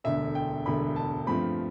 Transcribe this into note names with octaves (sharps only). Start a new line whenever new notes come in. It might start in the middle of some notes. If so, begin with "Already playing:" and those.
E1 D2 D3 E5
G5
E1 D2 D3 B5
A5
G2 F3 A3 C4 B5